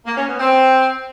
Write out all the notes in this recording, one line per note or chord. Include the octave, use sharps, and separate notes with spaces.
A#3
C#4
B3
C4